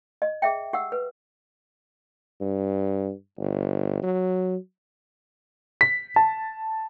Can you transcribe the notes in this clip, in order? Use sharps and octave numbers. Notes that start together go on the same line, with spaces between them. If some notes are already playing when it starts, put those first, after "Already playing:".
D#5
G#4 E5 G5
G4 F#5 E6
B4
G2
G1
F#3
B6
A5